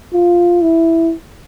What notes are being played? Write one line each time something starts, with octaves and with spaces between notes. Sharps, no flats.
F4
E4